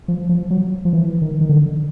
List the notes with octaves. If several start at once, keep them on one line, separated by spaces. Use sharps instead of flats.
F3
F3
F#3
F3
E3
D#3
D#3
D3